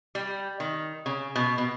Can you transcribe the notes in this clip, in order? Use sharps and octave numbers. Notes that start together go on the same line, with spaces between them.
G3
D#3
C#3
B2
B2